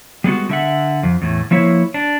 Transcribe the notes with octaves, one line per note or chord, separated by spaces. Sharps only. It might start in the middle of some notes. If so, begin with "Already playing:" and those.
G3 G#3 B3 F#4
D3 E5 F#5
F2
E2 A2
F3 A#3 E4 C#5
D4